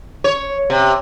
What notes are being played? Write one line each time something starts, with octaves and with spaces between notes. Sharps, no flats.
C#5
C3